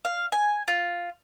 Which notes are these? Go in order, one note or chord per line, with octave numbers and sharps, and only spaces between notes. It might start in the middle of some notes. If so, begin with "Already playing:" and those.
F5
G#5
F4